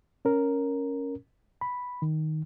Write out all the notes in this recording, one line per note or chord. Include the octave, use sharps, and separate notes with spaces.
C#4 A#4
B5
D#3